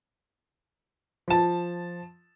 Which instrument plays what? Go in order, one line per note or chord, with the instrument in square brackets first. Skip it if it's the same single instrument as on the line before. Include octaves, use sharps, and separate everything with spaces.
[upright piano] F3 A5